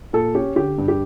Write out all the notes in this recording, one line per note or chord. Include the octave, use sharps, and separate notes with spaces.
A#2 A4
C#4 G4
D3 G4
G2
G4